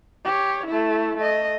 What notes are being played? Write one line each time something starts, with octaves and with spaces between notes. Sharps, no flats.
G4 C#5
A3 E4
A3 D#5